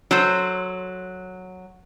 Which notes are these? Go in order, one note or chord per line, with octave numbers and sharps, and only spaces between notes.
F#3 A4 C5